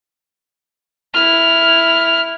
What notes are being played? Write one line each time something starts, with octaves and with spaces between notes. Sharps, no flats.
E4 F6